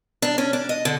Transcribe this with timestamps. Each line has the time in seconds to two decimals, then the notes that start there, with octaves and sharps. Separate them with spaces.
0.22 D4
0.38 C#4
0.53 D4
0.69 D#5
0.85 D3